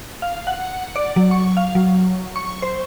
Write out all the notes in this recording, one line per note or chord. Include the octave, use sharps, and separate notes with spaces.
F5
F#5
D5
F#3
C#6
F5
F#3
C#6
C5